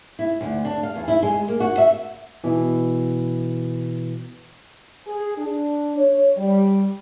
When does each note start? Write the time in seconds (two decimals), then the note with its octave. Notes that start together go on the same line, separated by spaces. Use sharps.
0.19 E4
0.41 D2
0.65 D4
0.83 F5
0.95 E2
1.08 E4
1.23 G#3
1.48 A#3
1.60 F#4
1.78 E5
2.44 B2 E3
5.06 G#4
5.37 D4
5.97 C#5
6.37 G3